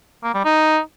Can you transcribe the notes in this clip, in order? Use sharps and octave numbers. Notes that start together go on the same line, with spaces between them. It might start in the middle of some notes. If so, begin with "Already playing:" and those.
A#3
G3
D#4